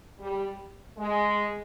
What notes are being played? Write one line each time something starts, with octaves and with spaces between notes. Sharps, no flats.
G3
G#3